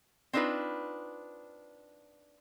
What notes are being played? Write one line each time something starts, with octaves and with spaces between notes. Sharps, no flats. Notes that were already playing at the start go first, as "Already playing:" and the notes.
C4 D4 D#4 F4 B4